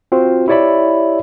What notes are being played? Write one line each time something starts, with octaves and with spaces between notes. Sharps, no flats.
C4 F4 F#4 C5
E4 G4 C#5 D5 E5 B5